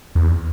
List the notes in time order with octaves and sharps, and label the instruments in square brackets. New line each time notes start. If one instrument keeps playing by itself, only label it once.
[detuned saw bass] E2